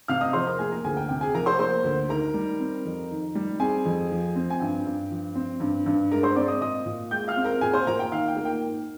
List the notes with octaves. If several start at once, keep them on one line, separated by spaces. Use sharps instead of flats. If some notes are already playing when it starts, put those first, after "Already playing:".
C3 F5 F6
D#5 D#6
F3 C5 C6
A#4 A#5
A#3 G#4 G#5
A#4 A#5
D2 G#4 G#5
G5
C3 G5
G#4 G#5
F3 A#4 A#5
C5 C6
A#3 C5 C6
D2
D#3 A#4 A#5
G3
C4
F2
D#3
G3
C4 G#4 G#5
F2
F3
C4
G#5
G2 G5
G2
F3
C4
G2
G2
G#3 A#4 A#5
C5 C6
C4 D5 D6
D#5 D#6
A#2 D#5 D#6
A#2
G#3 G5 G6
F5 F6
C4
A#4 A#5
A#2 G#4 G#5
C5 C6
A#2 A#4 A#5
G5
D#3 F5
G5
A#3
G5
G#2